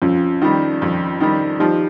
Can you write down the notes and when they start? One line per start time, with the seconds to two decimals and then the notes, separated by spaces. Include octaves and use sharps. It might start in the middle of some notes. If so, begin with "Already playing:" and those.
0.02 F2 C#4 F4
0.42 D#3 G3
0.82 F2
1.20 D#3 G3
1.60 F3 D#4 G4